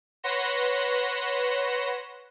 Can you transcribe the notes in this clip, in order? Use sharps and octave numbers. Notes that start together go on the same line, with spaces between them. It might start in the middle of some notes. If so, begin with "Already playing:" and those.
B4 C#5 F#5 C6 A#6 E7